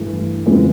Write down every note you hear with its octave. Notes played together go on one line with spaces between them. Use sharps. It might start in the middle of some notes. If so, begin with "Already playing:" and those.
Already playing: G2 E3 A3
F2 C#3 E3 G#3 C4